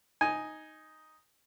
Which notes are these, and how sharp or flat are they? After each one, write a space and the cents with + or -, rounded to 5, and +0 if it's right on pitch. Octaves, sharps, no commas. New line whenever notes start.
D#4 +0 G#5 +0